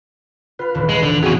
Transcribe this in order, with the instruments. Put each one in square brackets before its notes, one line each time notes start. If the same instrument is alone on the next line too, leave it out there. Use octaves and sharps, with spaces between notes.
[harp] F4 F5 [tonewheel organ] B4
[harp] D#1 G#1 E3
[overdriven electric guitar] G#3
D3
[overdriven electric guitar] F2 B2 [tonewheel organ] F#4 G#4